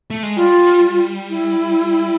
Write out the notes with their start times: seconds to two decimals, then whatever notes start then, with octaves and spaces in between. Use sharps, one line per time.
0.10 A3
0.23 G#3
0.36 G3 F4
1.30 E4